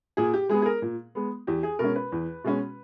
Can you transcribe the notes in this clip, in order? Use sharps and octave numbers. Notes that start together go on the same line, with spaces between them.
A#2 G#4
G4
G#3 B3 G#4
G#4
A#4
A#2
G#3 B3
E2 G4
G#4
B2 G#3 C#4 A#4
B4
E2
B2 G#3 C#4